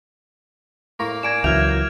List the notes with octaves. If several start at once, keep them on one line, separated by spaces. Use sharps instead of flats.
A2 A#3 A#5 C#6
D5 G#5 A#5 G#6 D7 E7
C#2 E3 F#3 E5 F6 G6 F7